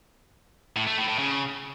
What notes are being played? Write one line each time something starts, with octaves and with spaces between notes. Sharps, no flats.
A2
A3
A2
A2
C#3